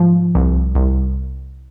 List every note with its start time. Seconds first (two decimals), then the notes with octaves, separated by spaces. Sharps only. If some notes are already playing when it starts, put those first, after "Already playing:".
Already playing: G#2 F3
0.35 C2
0.75 C2